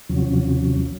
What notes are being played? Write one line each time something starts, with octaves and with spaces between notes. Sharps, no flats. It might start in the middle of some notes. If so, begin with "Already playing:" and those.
D#2 C3 F3 F#3 C#4